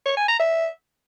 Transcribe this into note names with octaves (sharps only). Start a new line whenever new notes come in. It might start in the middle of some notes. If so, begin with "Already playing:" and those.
C#5
G#5
A#5
E5